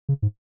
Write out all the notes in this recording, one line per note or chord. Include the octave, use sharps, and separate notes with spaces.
C#3
G#2